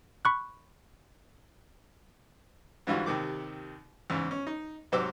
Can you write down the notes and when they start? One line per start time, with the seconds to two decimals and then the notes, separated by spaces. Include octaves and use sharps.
0.25 B5 C#6 F#6
2.87 G#2 D3 E3 G3 F4 F#4
3.06 D#2 C3 D#3 D6
4.10 E2 G#2 C#3
4.31 C#4
4.47 D#4
4.92 G#2 C3 F#3 C5 D6 E6